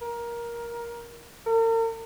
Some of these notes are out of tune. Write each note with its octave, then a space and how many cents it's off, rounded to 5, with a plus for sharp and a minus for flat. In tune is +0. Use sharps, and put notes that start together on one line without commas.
A#4 +15
A#4 -40